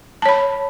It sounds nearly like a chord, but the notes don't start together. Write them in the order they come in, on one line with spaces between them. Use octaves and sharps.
A5 C#5 B5